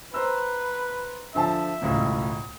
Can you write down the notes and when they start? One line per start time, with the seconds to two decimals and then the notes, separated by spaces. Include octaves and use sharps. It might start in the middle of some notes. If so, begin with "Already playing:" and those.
0.14 B4 C5 A#5 E6
1.35 D3 F3 E5 A5
1.82 E1 C#2 A2